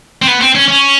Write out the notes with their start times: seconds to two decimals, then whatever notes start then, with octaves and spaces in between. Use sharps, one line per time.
0.22 C4
0.27 B3
0.41 C4
0.55 C#4
0.68 C#4